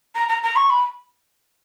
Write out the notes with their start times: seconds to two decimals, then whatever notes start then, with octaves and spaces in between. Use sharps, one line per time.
0.15 A#5
0.29 A#5
0.43 A#5
0.56 C#6
0.70 B5